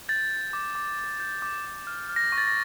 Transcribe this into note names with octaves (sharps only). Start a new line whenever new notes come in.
G6 A6
G6
D6
D6
G6
G6
D6
D6
F6
F6
A#6
C#6
A6
A#6